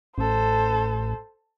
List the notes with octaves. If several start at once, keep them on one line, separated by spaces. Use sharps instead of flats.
A1 A4 C5